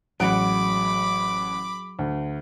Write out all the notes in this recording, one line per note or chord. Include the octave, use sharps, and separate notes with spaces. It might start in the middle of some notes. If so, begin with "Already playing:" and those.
A1 F#3 G#3 F#5 B5 D6 D7
D2